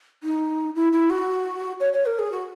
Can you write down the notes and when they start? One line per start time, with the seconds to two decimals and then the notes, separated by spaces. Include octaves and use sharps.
0.23 D#4
0.75 E4
0.93 E4
1.10 F#4
1.80 C#5
1.93 C#5
2.06 A#4
2.19 G#4
2.32 F#4